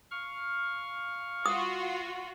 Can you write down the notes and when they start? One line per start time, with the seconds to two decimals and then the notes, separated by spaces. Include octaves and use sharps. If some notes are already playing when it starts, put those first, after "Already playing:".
0.11 F5 C#6 F6
1.46 F4 F#4 D#6